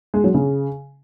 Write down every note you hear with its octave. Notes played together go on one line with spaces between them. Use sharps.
G#3
F#3
C#3